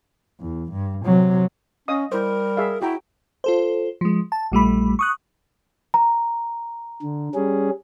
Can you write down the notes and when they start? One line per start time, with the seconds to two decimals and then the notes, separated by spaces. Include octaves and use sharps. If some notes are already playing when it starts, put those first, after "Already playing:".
0.40 E2
0.72 G2
1.06 C3 F#3
1.88 C#4 D#5 F5 D#6
2.12 G3 E4 A#4 C5
2.57 G#4 E5 F5
2.82 E4 F#4 G5 A#5
3.44 F4 A4 C5
4.01 F3 G#3
4.32 A5
4.52 A#1 G3 A3 B5
4.99 C#6 D#6 F#6
5.94 A#5
7.03 D3
7.35 G3 C#4 G#4